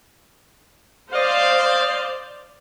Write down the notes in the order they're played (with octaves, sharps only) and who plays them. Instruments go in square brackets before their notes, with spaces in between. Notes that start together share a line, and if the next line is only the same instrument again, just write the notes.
[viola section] C5 D5 [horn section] D#5 F5